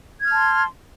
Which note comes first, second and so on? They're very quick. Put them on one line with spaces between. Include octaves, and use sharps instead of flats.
G#6 F6 A5 C6